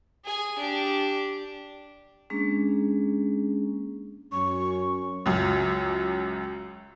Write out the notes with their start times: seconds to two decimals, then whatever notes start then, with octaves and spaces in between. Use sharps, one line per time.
0.25 G#4 G#5
0.58 D4 G4
2.30 G#3 A#3 C#4 D4 G#4
4.32 F#2 C#4 C#6
5.26 C#2 F#2